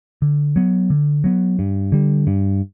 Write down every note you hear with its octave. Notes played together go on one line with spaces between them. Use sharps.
D3
F#3 B3
D3
F#3 B3
G2
D3 G3
G2